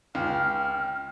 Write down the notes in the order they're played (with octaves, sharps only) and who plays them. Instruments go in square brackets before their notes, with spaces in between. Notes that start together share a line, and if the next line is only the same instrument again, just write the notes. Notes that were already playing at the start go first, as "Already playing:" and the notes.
[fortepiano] C#2 [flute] G5 [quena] F6